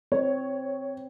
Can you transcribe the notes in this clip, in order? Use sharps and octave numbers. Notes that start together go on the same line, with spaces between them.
C4 C#5